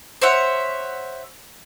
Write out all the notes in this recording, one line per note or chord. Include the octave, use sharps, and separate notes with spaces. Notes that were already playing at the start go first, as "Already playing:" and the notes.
C5 C#5 E5 F#5